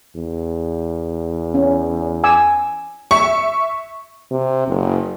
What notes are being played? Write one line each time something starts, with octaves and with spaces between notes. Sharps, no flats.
E2
C#4
G#5 D6 E6
E5 C#6
C3
F#1